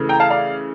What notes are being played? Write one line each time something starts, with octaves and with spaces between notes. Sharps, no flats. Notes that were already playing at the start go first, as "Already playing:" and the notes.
Already playing: C#3 E3 A3
G5 A#5
F5 A5
D5 F5